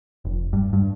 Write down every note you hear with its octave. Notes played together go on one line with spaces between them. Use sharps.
F1
G2
G2